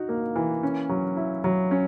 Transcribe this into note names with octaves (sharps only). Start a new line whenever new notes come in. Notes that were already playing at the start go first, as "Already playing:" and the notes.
Already playing: D#4 F#4
A#3
E3
C#4
F#3
E4
F#3
C#4